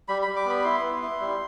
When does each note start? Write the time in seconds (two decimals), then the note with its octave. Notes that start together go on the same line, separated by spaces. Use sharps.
0.08 G3 B5
0.22 B5
0.28 G3
0.36 D6
0.46 B3 B5
0.64 E4 C6
0.83 B3
1.02 E4
1.20 G3